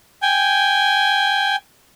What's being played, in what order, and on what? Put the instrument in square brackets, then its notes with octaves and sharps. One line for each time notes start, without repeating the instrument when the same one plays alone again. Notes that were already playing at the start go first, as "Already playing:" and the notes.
[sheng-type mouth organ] G5 G#5